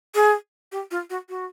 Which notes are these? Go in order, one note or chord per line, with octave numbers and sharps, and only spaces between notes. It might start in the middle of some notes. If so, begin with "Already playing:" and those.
G#4
G4
F4
F#4
F#4